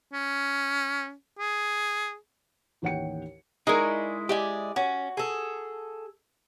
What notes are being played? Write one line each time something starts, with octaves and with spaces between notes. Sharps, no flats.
C#4
G#4
A1 D#2 C#5 F#5 G5 C#7
G#3 D#4 E4 G#4 A#4 D5 C#6
G4 D5 D#5 G#5
C#4 F#4
G#4 A4